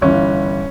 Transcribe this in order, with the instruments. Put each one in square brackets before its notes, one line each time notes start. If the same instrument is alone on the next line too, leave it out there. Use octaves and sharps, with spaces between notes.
[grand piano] G1 G2 E3 C#4